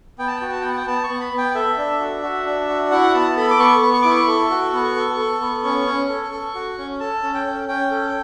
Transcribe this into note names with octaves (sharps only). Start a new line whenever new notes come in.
B3 G5
A5
F#4 G5
A5
B3 G5
F#5
G5
B3 A5
C#6
B3
B5
B3
G5
A4 E5
D4
F#4
F#4
D4
F#4
E4 F#5
B3 A5
A4 B5
D6
B3 C#6
B3
C#6
E4 D6
C#6
A4
F#4
B3
A4
A4
B3
C#4 C#6
C#4
A4
A4
F#4
C#4
A4 A5
C#4
G5
C#4
C#4 G5
A4